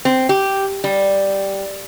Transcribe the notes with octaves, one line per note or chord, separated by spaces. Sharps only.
C4
G4
G3